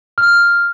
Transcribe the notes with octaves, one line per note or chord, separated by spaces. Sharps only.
F6